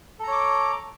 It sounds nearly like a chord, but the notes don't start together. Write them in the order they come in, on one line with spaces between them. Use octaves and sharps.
A4 A#5 C#5 D6